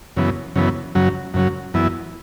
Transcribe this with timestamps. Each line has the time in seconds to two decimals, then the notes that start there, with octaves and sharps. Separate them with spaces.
0.17 F#2 C#3 E3 B3
0.56 F#2 C#3 E3 B3
0.95 F#2 C#3 F#3
1.34 F#2 C#3 F#3
1.74 F#2 E3 B3 E4